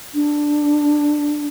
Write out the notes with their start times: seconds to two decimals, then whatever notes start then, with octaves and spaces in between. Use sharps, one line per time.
0.15 D4